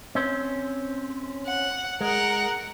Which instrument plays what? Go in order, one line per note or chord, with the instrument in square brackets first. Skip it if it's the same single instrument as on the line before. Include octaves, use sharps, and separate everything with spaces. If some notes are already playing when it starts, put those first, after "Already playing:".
[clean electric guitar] C4 C#4 C5
[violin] F#5
[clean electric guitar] G#3 [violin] A#4 F#5